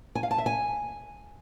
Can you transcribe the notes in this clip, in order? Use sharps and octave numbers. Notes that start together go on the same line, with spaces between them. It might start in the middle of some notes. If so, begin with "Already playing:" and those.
G#5
F5
A5
E5
G#5